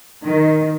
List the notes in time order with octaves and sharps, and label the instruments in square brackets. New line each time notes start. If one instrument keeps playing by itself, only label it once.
[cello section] D#3